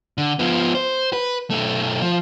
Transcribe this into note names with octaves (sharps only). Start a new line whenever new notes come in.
D3
F3 B3
C5
B4
B1 A3
F3